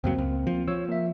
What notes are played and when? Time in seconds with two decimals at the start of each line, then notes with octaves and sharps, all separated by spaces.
0.04 C#2 F#2 F#3 A#3 C4
0.18 C#2
0.47 F3
0.68 F3 C#5 E6
0.89 A#3 E5